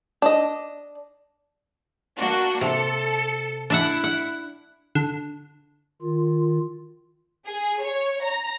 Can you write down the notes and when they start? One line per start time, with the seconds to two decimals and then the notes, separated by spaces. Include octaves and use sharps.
0.22 D4 D#5
2.16 A#3 D4 F#4
2.61 C3 A4 C#7
3.70 D4 E4 E5 F#5
4.04 F#5
4.95 D3
6.01 D#3 F4
7.46 G#4
7.82 C#5
8.23 A#5